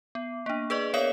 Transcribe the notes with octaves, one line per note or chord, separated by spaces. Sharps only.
B3
A#3 D4
G#4 B4 D5 D#5
B3 A#4 C#5 F5 D6 F#7